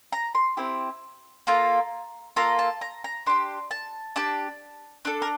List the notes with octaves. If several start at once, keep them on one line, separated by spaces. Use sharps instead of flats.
A#5
C6
C4 E4 G4
A#3 F4 A4 A#5
A#3 F4 A4 A#5
A5
A#5
A#5
D4 G4 C6
A5
D4 G4 A5
D4 A4
A#4